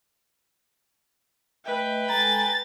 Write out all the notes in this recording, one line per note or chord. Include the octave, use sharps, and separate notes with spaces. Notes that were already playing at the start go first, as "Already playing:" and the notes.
A3 B4 D#5 E5 G5
G#3 A4 G#5 A#5 A6